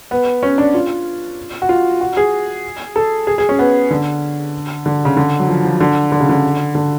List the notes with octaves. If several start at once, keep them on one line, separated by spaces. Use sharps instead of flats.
B3
C#4
D4
F4
F#4
F4
F#4
G#4
A4
G#4
G#4
C#4
B3
D3
D3
C#3
D3
F#3
F3
F3
D3
D3
C#3
D3
D3